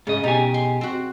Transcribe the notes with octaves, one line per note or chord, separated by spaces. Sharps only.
G#2 C#3 D#5
B2 D#4 G4 G#5
C6
C4 F#4